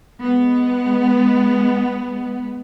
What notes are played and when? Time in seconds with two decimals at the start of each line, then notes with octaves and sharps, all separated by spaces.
0.23 G#3 B3